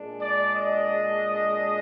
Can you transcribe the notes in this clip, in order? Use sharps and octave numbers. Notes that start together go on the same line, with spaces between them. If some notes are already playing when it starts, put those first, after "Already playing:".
Already playing: A#2 G#3 D4
D5
D#5